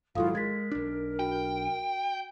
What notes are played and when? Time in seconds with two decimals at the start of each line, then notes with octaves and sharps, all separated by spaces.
0.15 G#1 G#2 F#3 E4 F4 A4 F5 D#6
0.35 G#3 A#4 G#6 A6 B6
0.72 B1 D4
1.19 F#4 G5